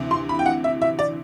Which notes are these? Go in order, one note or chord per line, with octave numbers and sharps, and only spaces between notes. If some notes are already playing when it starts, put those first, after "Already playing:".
Already playing: D2 C3 E3
C6
B5
G5
F#5
E5
E5
D5